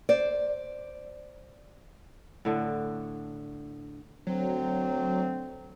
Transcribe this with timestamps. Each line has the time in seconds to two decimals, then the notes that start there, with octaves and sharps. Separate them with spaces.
0.09 C5 D5
2.45 A2 D3 D4
4.27 D2 F#3 C4